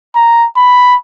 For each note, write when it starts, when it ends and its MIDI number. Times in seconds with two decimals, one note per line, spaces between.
0.16 0.46 82
0.56 0.95 83